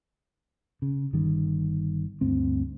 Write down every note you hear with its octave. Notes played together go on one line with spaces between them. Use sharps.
C#3
G1 D#3 G3
D2 G2 C4